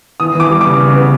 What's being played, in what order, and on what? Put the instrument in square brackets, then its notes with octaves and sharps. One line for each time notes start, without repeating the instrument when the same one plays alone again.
[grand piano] E3 D#6
E3 D6
G3
D6
C#3
C#3
B3